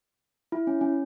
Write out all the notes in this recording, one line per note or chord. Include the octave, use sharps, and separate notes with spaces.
E4
C#4
C#4